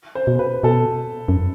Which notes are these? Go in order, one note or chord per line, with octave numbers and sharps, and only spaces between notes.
C5
B2
C5
B4
B2 A4
F#2